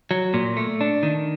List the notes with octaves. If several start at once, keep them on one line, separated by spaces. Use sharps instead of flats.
F#3
A#2
A3
D4
D#3